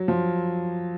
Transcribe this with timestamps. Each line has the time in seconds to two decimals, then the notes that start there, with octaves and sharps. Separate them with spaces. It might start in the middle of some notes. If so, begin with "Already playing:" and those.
Already playing: F#3
0.08 F3